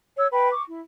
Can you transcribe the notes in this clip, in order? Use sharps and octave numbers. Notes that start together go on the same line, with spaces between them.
C#5 E6
B4 G5 B5
C#6 D6
E4